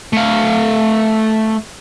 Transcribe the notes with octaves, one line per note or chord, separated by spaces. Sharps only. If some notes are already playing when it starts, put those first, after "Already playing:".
A3 F5